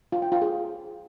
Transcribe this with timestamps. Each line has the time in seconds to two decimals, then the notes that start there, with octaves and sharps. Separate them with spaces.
0.12 F4
0.22 G5
0.32 F4
0.42 G#4